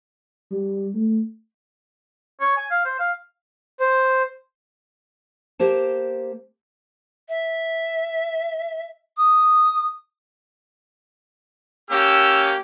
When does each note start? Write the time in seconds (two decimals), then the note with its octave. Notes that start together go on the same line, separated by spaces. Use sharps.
0.52 G3
0.94 A3
2.41 C#5
2.57 G#5
2.71 F5
2.85 C5
2.99 F5
3.80 C5
5.59 A#3 G4 C5 A5
7.28 E5
9.17 D#6
11.91 A#3 C#4 G4 E6